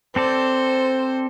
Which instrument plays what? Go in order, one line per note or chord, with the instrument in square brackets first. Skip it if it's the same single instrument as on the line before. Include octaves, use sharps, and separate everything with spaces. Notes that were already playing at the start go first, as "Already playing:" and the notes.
[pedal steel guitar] C4 A4 D5 [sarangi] C5